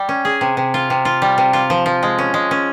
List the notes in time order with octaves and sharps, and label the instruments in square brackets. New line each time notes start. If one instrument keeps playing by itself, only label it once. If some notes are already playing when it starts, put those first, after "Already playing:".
Already playing: [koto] G3
C#4
G#4
C3
C3
F4
C3
F4
G3
C3
F4
F3
F3
G#3
C#4
G#3
C#4